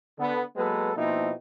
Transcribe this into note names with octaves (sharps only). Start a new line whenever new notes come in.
D3 B3
F#3 G#3 A#3 B3 A4 B4
B2 F3 A#3 C4 D#4 E4